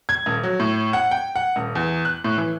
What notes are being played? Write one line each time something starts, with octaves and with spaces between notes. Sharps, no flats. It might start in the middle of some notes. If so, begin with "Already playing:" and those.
G#6
D#1
F#3
A2
F#5
G5
F#5
D#1
E2
F#6
A2
E3